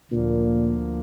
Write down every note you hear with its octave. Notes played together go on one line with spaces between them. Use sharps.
D2 A#2 D3 F3 A#3